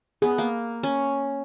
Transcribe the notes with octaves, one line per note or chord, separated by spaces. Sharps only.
B3 G#4
A#3
C#4